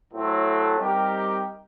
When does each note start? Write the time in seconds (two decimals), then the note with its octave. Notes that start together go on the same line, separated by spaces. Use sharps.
0.11 A2 F#3 A3 C4
0.78 G3 C4 D#4 G4 A#4